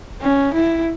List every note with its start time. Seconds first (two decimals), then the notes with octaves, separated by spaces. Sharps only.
0.22 C#4
0.54 E4